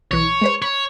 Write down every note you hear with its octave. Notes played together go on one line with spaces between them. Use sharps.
B1 E3 C#5
G#3 B4 C5
C#5 B5